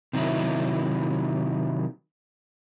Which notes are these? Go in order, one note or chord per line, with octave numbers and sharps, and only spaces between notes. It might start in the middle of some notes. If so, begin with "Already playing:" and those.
C3 D#3 F#3 E4